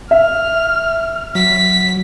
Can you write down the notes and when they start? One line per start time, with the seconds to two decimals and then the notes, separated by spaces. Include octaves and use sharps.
0.11 E5 F6
1.35 F#3 B6